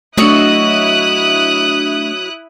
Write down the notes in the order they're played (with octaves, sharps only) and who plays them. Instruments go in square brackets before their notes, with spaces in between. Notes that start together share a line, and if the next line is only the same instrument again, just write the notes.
[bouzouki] F#3 F#4 D#5 [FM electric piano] A3 D4 [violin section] E4 D#6 F#6